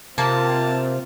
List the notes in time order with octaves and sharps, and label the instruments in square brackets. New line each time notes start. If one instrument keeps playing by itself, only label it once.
[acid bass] C3 [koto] A#3 [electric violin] C4 F4 [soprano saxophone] A5